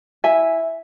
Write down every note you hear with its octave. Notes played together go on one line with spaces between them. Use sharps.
E4 E5 G#5